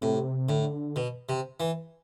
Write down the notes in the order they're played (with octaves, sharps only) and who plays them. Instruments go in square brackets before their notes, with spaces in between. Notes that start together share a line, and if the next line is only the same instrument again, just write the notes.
[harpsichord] A2 [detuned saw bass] C3
[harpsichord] A2 [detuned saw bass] D3
[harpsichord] B2
C3
E3